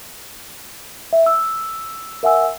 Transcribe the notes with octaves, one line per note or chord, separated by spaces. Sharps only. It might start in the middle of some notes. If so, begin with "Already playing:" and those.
E5
E6
A#4 E5 F#5 G#5 E6